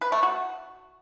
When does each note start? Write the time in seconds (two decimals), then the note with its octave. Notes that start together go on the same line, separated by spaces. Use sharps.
0.01 B4
0.12 A3
0.23 F#4